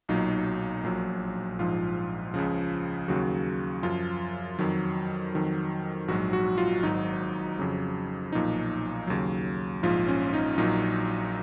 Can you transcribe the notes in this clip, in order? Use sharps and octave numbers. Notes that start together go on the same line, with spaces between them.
B1 A#2 F#3 D#4
A#1 A#2 F#3
A#1 G#2 F3 F4
C#2 C#3 F3
D#2 C#3 F#3 F#4
F#2 F3 F4
F2 D#3 F#3
F2 D#3 F#3
A#1 G#2 F#3 F#4
F#4
F4
G#1 G#2 F#3 D#4
F2 C#3 F#3
B1 A#2 F3 D#4
D#2 C#3 F#3
A#1 G#2 F3 F4
C#4
D#4
A#1 A#2 F#3 D#4